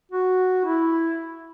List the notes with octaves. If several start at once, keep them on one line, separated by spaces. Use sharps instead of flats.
F#4
E4